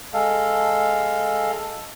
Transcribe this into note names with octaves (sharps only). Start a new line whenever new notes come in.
G#3 A4 F5